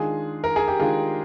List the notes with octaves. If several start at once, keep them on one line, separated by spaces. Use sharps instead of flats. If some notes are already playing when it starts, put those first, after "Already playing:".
Already playing: D#3 G#3 D4 F4 G#4
A#4
G#4
G4
D#3 G#3 D4 F4